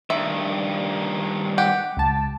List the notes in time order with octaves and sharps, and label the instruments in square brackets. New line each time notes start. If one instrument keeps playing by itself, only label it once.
[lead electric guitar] G2 D#3 [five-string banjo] E5
[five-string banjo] G4 [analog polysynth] F#5
[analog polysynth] C#2 A5